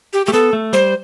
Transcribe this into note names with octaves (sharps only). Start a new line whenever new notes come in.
G4
A3 G4
B3 A4
A3
G3 C5